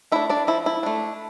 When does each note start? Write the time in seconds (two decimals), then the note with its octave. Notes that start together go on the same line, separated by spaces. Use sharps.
0.12 A3 D4 E4 E5
0.29 D4 D5
0.47 F3 E4
0.66 E4
0.83 A3 D4